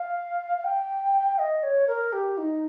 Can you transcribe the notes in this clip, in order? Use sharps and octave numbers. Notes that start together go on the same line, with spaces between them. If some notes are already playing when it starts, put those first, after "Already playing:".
Already playing: F5
F5
G5
D#5
C#5
A#4
G4
D#4